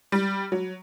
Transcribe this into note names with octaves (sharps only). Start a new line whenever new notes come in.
G3
F#3